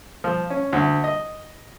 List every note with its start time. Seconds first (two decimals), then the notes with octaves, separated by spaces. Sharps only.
0.24 F3
0.50 C#4
0.73 D2
1.04 D#5